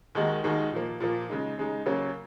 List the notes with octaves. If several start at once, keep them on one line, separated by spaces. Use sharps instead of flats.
D#2 D#3 G#3 D#4 F#4
D#2 D#3 G#3 D#4 F#4
A#2 F3 A#3
A#2 F3 A#3
C#3 G#3 D#4
C#3 G#3 D#4
C#3 F#3 A#3 C#4